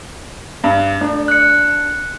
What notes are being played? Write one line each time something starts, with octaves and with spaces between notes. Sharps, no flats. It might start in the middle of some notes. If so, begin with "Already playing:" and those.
G2
A3 D4
F#6 C#7